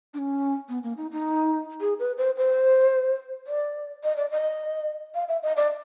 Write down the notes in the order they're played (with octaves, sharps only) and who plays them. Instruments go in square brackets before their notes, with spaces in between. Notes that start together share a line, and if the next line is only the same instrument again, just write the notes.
[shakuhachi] D4
C#4
B3
A#3
D#4
D#4
G#4
B4
C5
C5
D5
D#5
D5
D#5
F5
E5
D#5
D5